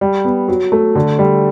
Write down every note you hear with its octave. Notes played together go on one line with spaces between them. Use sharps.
G3
B3
F#3
A3
D3
G3